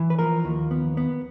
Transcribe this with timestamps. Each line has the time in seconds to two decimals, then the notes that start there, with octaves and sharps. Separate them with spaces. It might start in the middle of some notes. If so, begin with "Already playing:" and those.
Already playing: E3
0.10 B4
0.19 F3 A#4
0.45 D#2
0.71 B3
0.97 B3